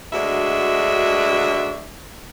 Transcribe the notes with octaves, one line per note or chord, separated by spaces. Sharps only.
D2 G#3 D4 F#4 E5